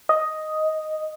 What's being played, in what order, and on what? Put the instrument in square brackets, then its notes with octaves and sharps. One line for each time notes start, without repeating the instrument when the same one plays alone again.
[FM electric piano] D#5